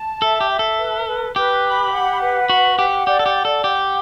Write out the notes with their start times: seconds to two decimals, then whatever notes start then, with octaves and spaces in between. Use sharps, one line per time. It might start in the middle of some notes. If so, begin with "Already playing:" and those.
Already playing: A5
0.21 A4 E5
0.41 G4
0.50 E5
0.59 A4
0.79 B4
1.07 B4
1.36 G4 B4
1.65 B5
1.92 F#5
2.21 B4
2.49 F#4 F#5
2.78 G4 F#5
3.07 G4 D5
3.19 A4
3.26 G4
3.36 F#5
3.45 A4
3.64 G4 F#5